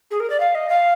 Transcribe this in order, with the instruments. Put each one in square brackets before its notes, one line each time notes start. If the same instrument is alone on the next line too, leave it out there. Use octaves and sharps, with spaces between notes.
[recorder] G#4
A#4
D5
F5
D#5
F5